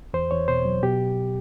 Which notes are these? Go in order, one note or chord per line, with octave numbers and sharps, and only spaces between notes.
E2 C5
E2 C#5
B2 C5
F#3
B2 G4